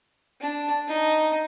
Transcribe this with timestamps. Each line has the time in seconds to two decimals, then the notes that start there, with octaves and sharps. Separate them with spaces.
0.41 D4
0.88 D#4